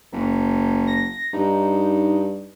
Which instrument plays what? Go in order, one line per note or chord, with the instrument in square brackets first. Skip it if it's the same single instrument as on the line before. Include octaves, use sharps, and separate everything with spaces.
[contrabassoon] F#1
[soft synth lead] A#6
[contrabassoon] G2 [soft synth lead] D#4